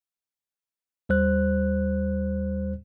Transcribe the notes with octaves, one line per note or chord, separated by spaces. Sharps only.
D#2 G3 C5 F#6